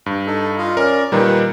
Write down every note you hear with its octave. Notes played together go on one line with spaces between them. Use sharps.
G2
D#4 A4
F4 D#5 F5
C#4 A#4 D5
A#2 D#3 G3 D#4 A#4 B4